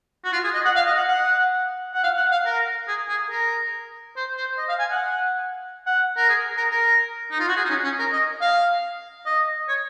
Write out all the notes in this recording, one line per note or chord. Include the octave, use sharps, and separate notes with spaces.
F#4
F4
G#4
D#5
F#5
F5
D#5
F#5
F#5
F#5
F5
F#5
F5
A#4
G#4
G#4
A#4
C5
C5
D#5
F5
G#5
F#5
F#5
A#4
G#4
A#4
A#4
D#4
F4
F#4
G#4
D#4
C#4
C#4
A#4
D#5
F5
D#5
C#5